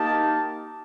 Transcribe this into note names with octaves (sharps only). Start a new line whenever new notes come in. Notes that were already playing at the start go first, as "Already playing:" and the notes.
Already playing: A#3 D#4 G4 A5